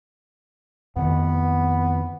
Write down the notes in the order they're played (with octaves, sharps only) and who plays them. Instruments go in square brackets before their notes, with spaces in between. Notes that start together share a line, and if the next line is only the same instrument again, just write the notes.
[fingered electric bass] F2 D#3 [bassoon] B3